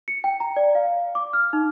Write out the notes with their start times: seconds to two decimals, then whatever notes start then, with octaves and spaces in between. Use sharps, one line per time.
0.08 C#7
0.24 G5
0.40 A#5
0.56 D5
0.75 F5
1.15 D6
1.33 F6
1.53 D#4